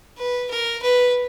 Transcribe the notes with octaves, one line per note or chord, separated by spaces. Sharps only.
B4
A#4
B4